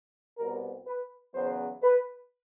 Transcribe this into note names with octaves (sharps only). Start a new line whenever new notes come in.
C2 B2 G3 B3 A#4
B4
E2 C#3 F#3 B3 C5
B4